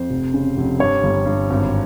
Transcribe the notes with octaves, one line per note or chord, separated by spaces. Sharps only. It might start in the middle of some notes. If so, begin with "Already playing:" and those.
Already playing: F2 C5
F1
C#3
F1
G2 C#5
G1
G2
G#1